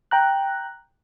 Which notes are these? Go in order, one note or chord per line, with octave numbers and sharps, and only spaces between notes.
G5 A#5 F#6